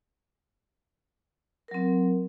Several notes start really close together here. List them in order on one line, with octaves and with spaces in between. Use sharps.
A#4 F#3 C4